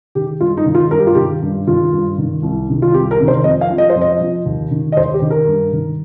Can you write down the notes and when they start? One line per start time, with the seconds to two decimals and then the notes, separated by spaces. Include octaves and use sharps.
0.15 D#3 G4
0.41 G2 F4
0.57 D#4
0.66 D#3
0.75 F4
0.91 G2 A#4
0.99 G4
1.07 F4
1.15 D#3 G4
1.42 G2
1.67 D#3 F4
1.93 G2
2.18 D#3
2.43 C2
2.69 C3 D#3
2.82 F4
2.94 C2 G4
3.11 A#4
3.19 C3 D#3
3.28 C5
3.44 F2 D#5
3.61 F5
3.70 F3
3.78 D#5
3.90 C5
3.96 F2
4.01 D#5
4.21 F3
4.46 D#2
4.71 D#3
4.92 D#5
4.97 D#2 C5
5.14 G4
5.22 D#3
5.31 A#4
5.47 G2
5.73 D#3